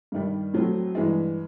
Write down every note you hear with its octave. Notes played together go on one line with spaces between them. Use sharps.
G2 D#3 G3
A2 F#3 A3 C4
G2 E3 G#3